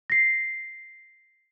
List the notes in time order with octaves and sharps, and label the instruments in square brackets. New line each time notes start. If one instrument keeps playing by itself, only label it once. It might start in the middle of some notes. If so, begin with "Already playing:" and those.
[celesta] A#6 C7